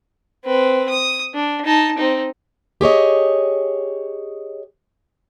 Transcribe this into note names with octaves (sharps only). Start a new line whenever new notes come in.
C4 B4
D#6
D4
D#4 A5
C4 D#4
G4 G#4 C#5 D#5